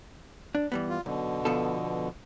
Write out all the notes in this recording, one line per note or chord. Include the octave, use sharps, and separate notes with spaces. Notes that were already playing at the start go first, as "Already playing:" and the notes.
D4
E3 G3 B3
F4
B1 B2 D3
F3 B3 A4